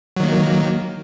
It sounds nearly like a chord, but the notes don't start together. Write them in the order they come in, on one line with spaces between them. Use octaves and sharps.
F#3 D#3 A#3